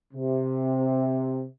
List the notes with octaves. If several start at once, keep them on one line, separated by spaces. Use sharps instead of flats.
C3